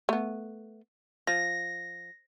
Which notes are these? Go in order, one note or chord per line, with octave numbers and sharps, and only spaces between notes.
A3 B3
F3 A#6